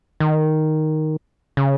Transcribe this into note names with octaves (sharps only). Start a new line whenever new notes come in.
D#3
C#3